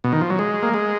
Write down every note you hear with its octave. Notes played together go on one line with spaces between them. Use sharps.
B2
D#3
F3
F#3
G#3
A#3
G#3